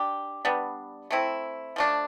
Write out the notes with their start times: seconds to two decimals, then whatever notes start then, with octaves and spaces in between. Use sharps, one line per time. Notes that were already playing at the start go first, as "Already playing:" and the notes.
Already playing: D4 G4
0.45 G3 B3 D4
1.11 A3 C4 E4
1.76 F3 A3 D4